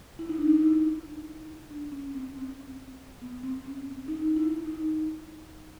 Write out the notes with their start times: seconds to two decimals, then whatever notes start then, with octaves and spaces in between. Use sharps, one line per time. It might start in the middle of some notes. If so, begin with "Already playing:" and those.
0.19 E4
0.29 D#4
0.38 D4
0.48 D#4
0.62 E4
1.71 D4
1.92 C#4
2.14 C4
2.36 C4
3.22 B3
3.43 C4
3.65 C#4
3.86 C#4
4.08 D#4
4.36 E4
4.66 D#4